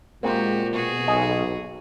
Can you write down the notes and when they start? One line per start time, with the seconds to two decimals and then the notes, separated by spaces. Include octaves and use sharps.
0.23 A#2 G#3 A#3 C4 F#4 G4
0.73 B2 F#4 G#4
1.08 B1 D#5 G#5